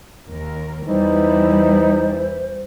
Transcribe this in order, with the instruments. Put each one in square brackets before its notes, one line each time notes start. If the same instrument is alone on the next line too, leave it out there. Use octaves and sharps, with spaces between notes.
[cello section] D#2 A#4
[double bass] E2 E3 [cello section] G3 E4 [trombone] D#4 [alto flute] C5